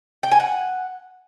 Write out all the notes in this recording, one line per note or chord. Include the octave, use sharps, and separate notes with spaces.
G5
G#5
F#5